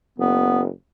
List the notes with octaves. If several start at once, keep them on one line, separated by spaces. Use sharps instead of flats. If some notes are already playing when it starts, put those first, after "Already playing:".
F#1 B3